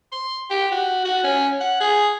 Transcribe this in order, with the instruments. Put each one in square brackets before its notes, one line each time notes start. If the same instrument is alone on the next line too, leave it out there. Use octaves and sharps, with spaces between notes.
[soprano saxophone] C6
G4
F#4
F#4
C#4
F#5
G#4